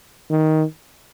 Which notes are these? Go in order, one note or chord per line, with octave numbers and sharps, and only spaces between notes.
D#3